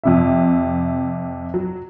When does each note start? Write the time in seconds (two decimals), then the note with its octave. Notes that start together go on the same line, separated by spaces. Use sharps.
0.04 F2 C3 E5
1.54 F#3